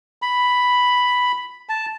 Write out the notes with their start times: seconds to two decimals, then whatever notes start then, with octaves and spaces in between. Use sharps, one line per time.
0.22 B5
1.69 A5